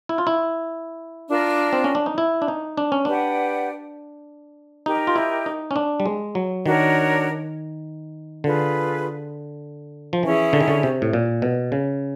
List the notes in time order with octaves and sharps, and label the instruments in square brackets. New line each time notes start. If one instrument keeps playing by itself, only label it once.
[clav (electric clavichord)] E4
F4
E4
[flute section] D4 F4 A#4
[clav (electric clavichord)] C4
C#4
D4
D#4
E4
D4
D#4
D4
C#4
[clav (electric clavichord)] D4 [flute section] G4 B4 D5 F#5
[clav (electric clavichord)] D#4 [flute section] G4 A#4 D#5
[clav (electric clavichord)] F4
E4
D#4
C#4
D4
G3
G#3
F#3
[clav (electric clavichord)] D#3 [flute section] D4 F#4 A#4 C#5
[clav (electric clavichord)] D3 [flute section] F4 G#4 B4
[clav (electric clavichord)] F3
[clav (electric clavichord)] E3 [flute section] C#4 E4 G#4
[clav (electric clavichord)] D3
D#3
D3
C3
A2
A#2
B2
C#3